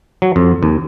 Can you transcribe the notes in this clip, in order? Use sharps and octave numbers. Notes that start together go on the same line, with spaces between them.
F#3
F2
D#2